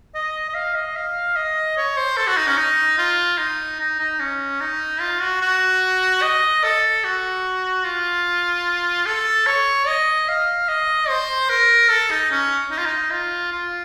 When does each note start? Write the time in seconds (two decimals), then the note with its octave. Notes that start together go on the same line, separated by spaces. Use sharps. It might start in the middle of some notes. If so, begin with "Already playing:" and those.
0.14 D#5
0.49 D#5
0.55 F5
0.75 D#5
0.96 F5
1.36 D#5
1.77 C#5
1.97 C5
2.17 A4
2.27 F#4
2.37 D#4
2.47 C#4
2.57 D#4
2.98 F4
3.38 D#4
3.80 D#4
3.99 D#4
4.20 C#4
4.60 D#4
5.00 F4
5.21 F#4
5.41 F#4
6.22 D#5
6.64 A4
7.04 F#4
7.84 F4
9.06 A4
9.47 C#5
9.88 D#5
10.28 F5
10.68 D#5
11.09 C5
11.49 A#4
11.90 A4
12.11 D#4
12.31 C#4
12.71 D#4
12.78 F4
12.86 D#4
13.11 F4
13.52 F4